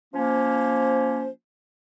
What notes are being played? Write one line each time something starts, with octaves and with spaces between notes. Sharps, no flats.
F3 A#3 C#4 C5